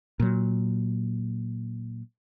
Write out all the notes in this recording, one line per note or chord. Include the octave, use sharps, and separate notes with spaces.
A#2 F#3